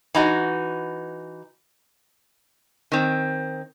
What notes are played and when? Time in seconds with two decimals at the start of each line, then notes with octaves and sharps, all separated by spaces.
0.15 E3 D#4 F#4
2.92 D#3 C4